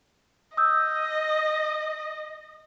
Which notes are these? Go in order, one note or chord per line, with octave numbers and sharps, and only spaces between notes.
D#5 D#6 E6 G6